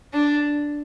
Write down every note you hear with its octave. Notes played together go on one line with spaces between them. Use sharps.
D4